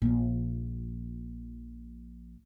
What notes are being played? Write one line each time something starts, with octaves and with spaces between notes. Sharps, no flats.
A#1 F3